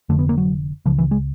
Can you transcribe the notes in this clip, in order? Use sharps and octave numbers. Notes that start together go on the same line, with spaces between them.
F1 F2 D3 A3
B3
A#3
F#3
C#2 C#3 F3
E3
G#3